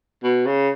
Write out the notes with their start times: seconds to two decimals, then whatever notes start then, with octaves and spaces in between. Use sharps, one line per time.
0.23 B2
0.46 C#3